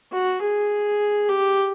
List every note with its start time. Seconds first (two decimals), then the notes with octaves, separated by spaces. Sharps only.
0.12 F#4
0.42 G#4
1.29 G4